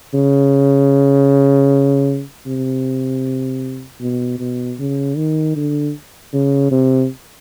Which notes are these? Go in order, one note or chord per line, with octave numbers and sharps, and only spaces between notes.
C#3
C3
B2
B2
C#3
D#3
D3
C#3
C3